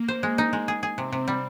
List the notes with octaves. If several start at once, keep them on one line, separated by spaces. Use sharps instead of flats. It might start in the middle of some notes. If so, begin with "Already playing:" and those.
Already playing: A#3
C5
G#3
D#4
G#3
G#4
G#4
C3 C4
C3
G3